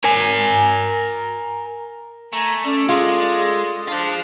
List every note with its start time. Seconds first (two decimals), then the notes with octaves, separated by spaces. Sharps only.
0.04 A#4 G#5
2.33 A3 G#5 A#5
2.64 C#4 A4 D5
2.89 G#3 F4 G#4
3.88 D4 F4 C5